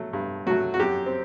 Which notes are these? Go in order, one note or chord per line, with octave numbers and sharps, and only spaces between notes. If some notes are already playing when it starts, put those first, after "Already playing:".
Already playing: F#3 A3
G2
F#3 A3 F#4
F#4
F#2 G4
C4